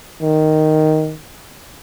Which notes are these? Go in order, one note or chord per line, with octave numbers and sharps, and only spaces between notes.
D#3